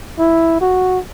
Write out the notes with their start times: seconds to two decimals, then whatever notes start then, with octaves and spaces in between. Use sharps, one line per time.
0.19 E4
0.61 F#4